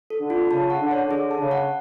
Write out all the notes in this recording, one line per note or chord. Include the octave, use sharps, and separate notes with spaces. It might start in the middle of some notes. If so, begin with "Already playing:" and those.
A4
D3
F4
C#3 A5
F#5
D3
C#5
D3 G#4
A5
C#3
F#5